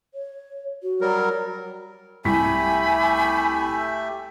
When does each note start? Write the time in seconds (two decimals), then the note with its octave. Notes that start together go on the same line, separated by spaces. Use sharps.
0.14 C#5
0.82 F#4
1.01 F#3 G3 A#4
2.25 C2 A3 G4 E5 G#5 B5 B6